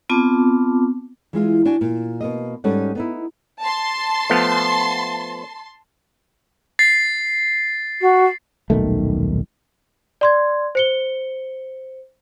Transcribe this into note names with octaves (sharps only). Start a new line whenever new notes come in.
B3 C4 F4 A5 D6
E3 G#3 F4
D4 F#4 G#5
A#2
B2 A#3 D#5
G#2 G3 C#4 D#4 A4 F#5
B3 D#4 E4
A5 C6
F3 A3 B3
A6 C7
F#4
D#1 B1 D#3 A3
D5 C6 G#6
C5 C#7 G7